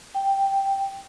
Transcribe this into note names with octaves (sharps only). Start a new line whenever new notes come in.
G5